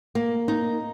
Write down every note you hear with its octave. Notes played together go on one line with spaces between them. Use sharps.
A#3
D#4